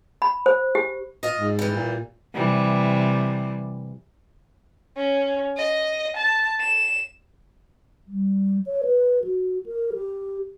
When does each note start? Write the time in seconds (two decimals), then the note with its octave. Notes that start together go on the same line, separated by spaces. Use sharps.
0.22 B5
0.46 C5
0.75 G4
1.23 F4 D#5
1.38 G#2
1.59 E3 G3
1.75 A#2
2.34 C3 E3 G3
4.97 C#4
5.57 D#5
6.17 A5
6.61 E7
8.08 G3
8.66 C#5
8.85 B4
9.24 F#4
9.66 A#4
9.93 G4